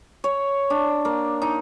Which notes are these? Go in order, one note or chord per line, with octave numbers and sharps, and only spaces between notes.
C#5
D4
A#3
D#4